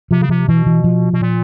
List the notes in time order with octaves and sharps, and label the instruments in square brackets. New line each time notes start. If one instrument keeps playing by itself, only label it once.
[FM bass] C3 [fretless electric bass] F3
[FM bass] C#3
[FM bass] C3 [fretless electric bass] F3
[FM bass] B2 [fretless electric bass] E3
[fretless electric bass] E3
F3
[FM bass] B2
A#2